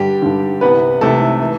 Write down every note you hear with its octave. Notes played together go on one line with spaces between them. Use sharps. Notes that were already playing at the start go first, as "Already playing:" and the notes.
Already playing: G2 D3 G3 G4
G2 D3
C2 C3 E3 B3 B4
C2 C3 E3 A3 A4
E3